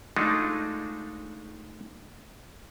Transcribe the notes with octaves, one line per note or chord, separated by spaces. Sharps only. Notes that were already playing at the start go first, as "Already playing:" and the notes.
G#3 A3 D4 D#4 F4 F#4